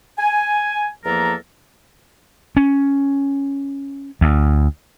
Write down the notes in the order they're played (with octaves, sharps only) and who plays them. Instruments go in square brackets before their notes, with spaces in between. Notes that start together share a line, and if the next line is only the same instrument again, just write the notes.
[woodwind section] G#5
E2 F3 A#3 A4 A#4 A#5
[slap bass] C#4
D2